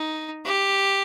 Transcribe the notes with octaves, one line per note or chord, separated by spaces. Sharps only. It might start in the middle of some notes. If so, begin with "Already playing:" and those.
Already playing: D#4
G4